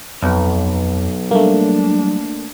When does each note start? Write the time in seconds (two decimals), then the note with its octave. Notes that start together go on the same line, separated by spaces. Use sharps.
0.23 B1 F2
1.31 F#3 G3 A3 A#3 D4